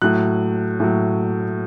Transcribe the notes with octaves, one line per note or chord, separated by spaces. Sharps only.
A2 F#3 F#6
A2 F#3